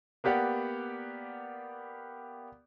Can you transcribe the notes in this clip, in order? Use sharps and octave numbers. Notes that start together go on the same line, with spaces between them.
A#3 B3 G4 D5 F#5